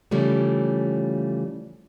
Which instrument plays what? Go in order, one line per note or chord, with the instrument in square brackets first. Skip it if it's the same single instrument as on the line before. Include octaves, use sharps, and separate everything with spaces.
[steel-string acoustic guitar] C#3 E3 F3 G3 A3